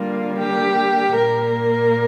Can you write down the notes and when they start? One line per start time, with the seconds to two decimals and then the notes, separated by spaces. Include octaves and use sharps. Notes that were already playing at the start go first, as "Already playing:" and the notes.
Already playing: D3 G3 A#3 F4
0.39 G4
1.15 A#2 A#3 A#4